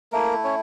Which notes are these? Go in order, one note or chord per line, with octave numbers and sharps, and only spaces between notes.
A3 A#3 E4 A#4
C#4 C#5